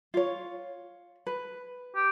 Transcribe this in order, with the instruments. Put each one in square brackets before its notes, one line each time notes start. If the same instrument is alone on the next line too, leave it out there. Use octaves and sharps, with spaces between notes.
[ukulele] F4 C#5
B4
[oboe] G4